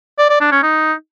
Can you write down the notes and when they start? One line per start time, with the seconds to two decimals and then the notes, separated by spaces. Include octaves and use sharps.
0.18 D5
0.29 D5
0.40 D4
0.51 C#4
0.63 D#4